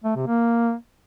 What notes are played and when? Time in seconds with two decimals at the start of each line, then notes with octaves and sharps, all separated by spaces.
0.04 A3
0.15 C3
0.27 A#3